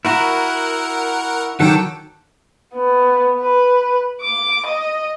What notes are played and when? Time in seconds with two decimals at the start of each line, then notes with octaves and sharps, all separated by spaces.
0.05 E4 F#4 A#4 F#5 A#5
1.60 D#3 F#3 A4 F#5 G5 D6
2.74 B3
3.40 B4
4.21 D6
4.66 D#5